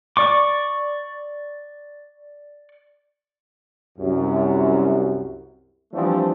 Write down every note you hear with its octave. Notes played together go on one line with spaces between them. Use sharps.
D5 C#6 D6
C2 F#2
E3 F3 G3 A3 C4 D4